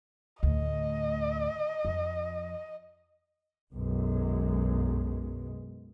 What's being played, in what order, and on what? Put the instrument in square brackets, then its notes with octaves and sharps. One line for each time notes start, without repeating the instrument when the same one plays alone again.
[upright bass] D2 A2 [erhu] D#5
[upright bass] F2 F3
[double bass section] B1 F#2 G#3